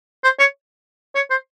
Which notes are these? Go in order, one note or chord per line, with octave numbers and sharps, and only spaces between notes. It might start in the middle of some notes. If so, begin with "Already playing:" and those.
C5
C#5
C#5
C5